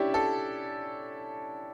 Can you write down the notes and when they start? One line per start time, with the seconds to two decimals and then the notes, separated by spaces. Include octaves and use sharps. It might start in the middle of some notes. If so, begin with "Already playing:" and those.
Already playing: C#4 D4 E4 G4
0.14 A4